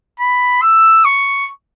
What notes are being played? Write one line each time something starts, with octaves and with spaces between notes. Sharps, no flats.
B5
E6
C#6